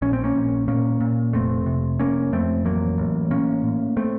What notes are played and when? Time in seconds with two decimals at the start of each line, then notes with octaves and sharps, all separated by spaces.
0.02 A#1 C#4
0.13 C4
0.24 A#3 C#4
0.35 A#1
0.68 A#2 A#3 C#4
1.00 A#2
1.33 F1 A3 C4
1.66 C3
1.99 F1 A#3 C#4
2.33 F2 A3 C4
2.65 A1 F#3 A#3
2.98 A1
3.31 A2 A#3 C#4
3.64 A2
3.97 A3 C4